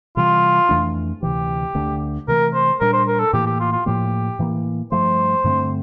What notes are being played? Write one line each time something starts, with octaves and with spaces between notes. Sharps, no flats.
C3 E3 G3 F4
F2 E3 A3 D4
D2 C3 E3 G4
D2 D3 A3 D4
C3 E3 A3 A#4
C5
A#2 G3 D4 A#4
C5
A#4
A4
A2 E3 A#3 G4
G4
F4
F4
A2 F3 A#3 G4
A2 E3 A#3
G2 F3 A3 C5
G2 D3 A3 C4